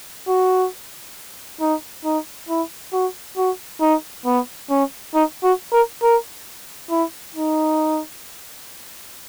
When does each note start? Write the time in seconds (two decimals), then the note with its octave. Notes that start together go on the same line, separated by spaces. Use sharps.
0.28 F#4
1.61 D#4
2.05 D#4
2.49 E4
2.93 F#4
3.37 F#4
3.81 D#4
4.26 B3
4.70 C#4
5.14 D#4
5.43 F#4
5.72 A#4
6.03 A#4
6.90 E4
7.35 D#4